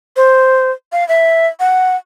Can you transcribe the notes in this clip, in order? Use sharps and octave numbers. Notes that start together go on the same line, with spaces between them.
C5
F5
E5
F#5